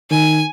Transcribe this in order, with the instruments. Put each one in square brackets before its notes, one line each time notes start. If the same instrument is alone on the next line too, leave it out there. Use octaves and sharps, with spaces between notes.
[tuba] D#3 [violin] G#5